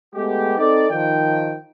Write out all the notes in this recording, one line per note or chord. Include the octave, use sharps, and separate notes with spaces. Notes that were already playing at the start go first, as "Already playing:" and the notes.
G#3 A3 B3 G4
C4 D#4 A4 D5
D#3 F3 G5